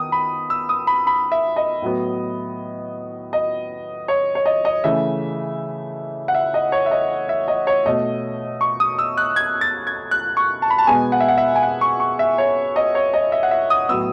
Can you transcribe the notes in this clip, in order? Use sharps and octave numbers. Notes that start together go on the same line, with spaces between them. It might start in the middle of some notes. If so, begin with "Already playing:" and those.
Already playing: D#3 B3 D#6
B5
E6
D#6
B5
B5
E5
D#5
A2 F#3 B3
D#5
C#5
C#5
D#5
D#5
C#3 E3 A3 E5
F#5
E5
D#5
C#5
E5
D#5
E5
D#5
C#5
B2 A3 D#5
C#6
D#6
E6
F#6
G#6
A6
G#6
F#6
C#6
A5
B5
A5
B2 G#3 B3 G#5
F#5
E5
F#5
E5
G#5
F#5
C#6
C#6
E5
C#5
D#5
C#5
D#5
E5
F#5
E5
D#6
A2 F#3 B3 E6